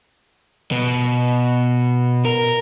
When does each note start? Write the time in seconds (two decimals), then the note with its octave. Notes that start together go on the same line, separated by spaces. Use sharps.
0.71 B2
2.25 A#4